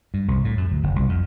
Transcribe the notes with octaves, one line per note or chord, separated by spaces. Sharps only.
G2
C2
A2
F#2
D2
F#1
C2
F2